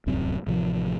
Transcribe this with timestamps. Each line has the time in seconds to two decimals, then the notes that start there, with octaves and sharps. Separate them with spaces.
0.06 D1 C2 F#2 C4
0.47 A1 C3 E3 F3